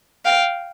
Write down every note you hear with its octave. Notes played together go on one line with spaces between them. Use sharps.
F5 G5